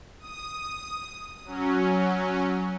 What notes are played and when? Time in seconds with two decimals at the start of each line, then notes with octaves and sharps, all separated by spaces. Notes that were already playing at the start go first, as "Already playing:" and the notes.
0.19 D#6
1.45 F#3 C#4